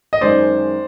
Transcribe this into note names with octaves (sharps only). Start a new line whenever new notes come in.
D#5
F#2 D#3 G#3 C5 D5